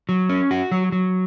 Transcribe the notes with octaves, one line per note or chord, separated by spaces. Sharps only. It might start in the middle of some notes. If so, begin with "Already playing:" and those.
F#3
C#4
F#4
F#3
F#3